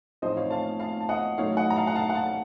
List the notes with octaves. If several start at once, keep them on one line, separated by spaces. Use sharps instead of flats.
A1 A2 F3 C4 D#4 C5 D#5
C#5 F5
F5 A5
F5 A5
A5
D#5 F#5
A1 A2 F#3 A3 D#4 C#5 F5
D#5 F#5
A#5
F5 A5
F#5
F5 A5
F#5
F5 A5